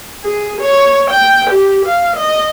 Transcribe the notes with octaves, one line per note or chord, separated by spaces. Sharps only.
G#4
C#5
G5
G4
F5
D#5